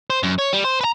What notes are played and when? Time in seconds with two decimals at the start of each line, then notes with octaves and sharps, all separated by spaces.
0.10 C5
0.23 F#2
0.39 C#5
0.53 G3
0.65 C5
0.81 B4 A#5